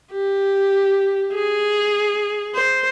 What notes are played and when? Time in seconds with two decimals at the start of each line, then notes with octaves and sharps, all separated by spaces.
0.13 G4
1.33 G#4
2.55 C5